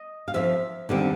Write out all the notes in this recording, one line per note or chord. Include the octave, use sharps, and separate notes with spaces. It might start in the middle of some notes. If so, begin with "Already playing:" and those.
Already playing: D#5
F5
F2 C3 F3 E5
D#2 D3 G3 C4